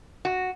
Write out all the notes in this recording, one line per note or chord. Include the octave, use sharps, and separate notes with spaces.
F#4